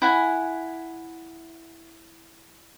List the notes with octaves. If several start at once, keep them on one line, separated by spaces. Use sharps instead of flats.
E4 F#5 G#5